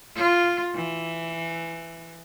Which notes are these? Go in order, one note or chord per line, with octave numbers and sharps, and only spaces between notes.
F4
E3